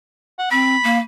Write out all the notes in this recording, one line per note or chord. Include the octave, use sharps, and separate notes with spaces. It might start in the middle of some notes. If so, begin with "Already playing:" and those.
F#5
C4 B5
A#3